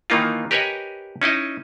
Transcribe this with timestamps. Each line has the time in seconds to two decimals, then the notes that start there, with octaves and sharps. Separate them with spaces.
0.10 D#3 E3 A#3 D#4 F4
0.51 G4 A#4 B4 C#5 D#5 G#5
1.22 C#4 D#4 E4 D#5